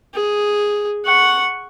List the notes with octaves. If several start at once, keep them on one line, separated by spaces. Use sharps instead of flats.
G#4
F#5 C#6